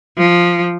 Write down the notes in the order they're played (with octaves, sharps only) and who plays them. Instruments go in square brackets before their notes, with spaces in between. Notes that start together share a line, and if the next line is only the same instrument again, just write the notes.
[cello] F3